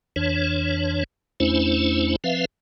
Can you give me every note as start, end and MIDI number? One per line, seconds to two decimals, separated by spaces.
0.16 1.04 41
0.16 1.04 52
0.16 1.04 62
0.16 1.04 73
1.40 2.16 40
1.40 2.16 57
1.40 2.16 61
1.40 2.16 62
1.40 2.16 64
1.40 2.16 72
2.24 2.45 53
2.24 2.45 60
2.24 2.45 71
2.24 2.45 76
2.24 2.45 77